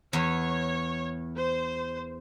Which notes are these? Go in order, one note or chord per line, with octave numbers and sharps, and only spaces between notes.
E2 C#5
C5